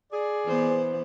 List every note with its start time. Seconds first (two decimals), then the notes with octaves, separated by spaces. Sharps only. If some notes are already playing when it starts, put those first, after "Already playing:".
0.12 G#4 D5
0.46 E3 B3 C5